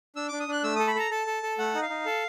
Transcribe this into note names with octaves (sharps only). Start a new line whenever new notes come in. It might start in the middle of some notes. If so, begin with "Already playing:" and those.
D4 E6
D4 D6
D#6
D4 F#6
A3 E6
A4 D#6
B5
A4 A#5
A4 A5
A4
A4
A3 F#5
D#4
F5
D#4
A4